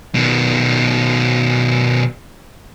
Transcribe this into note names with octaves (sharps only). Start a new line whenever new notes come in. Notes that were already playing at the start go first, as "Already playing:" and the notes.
B2 D#3